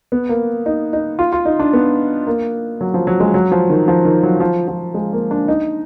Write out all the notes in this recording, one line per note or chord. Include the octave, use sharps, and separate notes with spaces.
B3
A#3
D#4
D#4
F4
F4
D#4
D4
B3
A#3
F#3
F3
F#3
G#3
F#3
F3
D#3
F3
D#3
F#3
F3
F3
G#3
A#3
D4
D#4